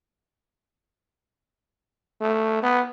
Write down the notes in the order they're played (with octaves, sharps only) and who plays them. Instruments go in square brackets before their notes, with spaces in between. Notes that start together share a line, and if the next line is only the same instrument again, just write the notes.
[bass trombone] A3
B3